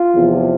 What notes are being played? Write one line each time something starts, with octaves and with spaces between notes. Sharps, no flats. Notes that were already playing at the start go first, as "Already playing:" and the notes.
Already playing: F4
E2 C3 F3